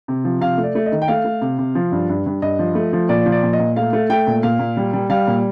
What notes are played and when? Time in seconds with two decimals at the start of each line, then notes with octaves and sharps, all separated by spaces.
0.08 C3
0.25 F3
0.41 C3 F5
0.58 A3
0.63 D5
0.75 A3
0.86 D#5
0.92 D#3
1.02 G5
1.08 A3 F5
1.25 A3
1.41 C3
1.59 C3
1.75 F3
1.92 G2
2.09 G2
2.26 G2
2.42 G2 D#5
2.59 F3
2.75 A3
2.93 F3
3.09 A#2 D5
3.26 F3
3.32 D5
3.43 A#2
3.53 D#5
3.60 A#2
3.76 A3 F5
3.93 A3
4.10 A3 G5
4.27 A#2
4.43 A#2 F5
4.59 A#2
4.77 G3
4.93 G3
5.10 G3 F5
5.27 A#2